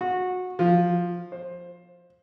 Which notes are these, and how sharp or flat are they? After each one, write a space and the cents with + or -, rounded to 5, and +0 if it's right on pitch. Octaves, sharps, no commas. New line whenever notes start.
F#4 -20
F3 +5
C5 +15